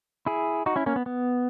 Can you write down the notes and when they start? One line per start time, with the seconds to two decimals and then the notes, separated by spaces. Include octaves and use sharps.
0.26 E4 G#4
0.66 D#4 F#4
0.76 C#4 E4
0.86 A#3 C#4
0.96 B3
1.06 B3